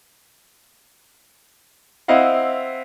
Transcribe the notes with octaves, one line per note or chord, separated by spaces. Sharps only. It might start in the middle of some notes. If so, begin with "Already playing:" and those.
C4 E4 D#5 F5 F#5